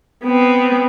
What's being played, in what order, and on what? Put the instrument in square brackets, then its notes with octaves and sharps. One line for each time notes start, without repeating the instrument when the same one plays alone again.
[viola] B3 C4